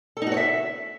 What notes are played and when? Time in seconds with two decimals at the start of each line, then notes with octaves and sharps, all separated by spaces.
0.17 A4
0.22 D#4
0.27 F#4
0.32 C#5
0.37 E5